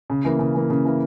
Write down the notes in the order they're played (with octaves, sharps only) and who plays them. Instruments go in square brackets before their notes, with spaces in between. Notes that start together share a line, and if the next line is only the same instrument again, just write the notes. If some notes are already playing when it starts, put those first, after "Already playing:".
[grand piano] C#3
E3 A#3
C#3
E3 A#3
C#3
E3 A#3